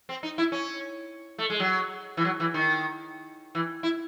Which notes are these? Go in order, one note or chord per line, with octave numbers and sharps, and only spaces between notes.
C4
D#4
E4
C#4
A3
G#3
F#3
E3
F#3
E3
D#3
E3
E4